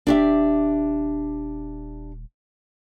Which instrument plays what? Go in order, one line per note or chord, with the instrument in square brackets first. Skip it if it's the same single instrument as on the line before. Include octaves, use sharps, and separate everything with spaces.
[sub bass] D#1 [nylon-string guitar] D4 G4 E5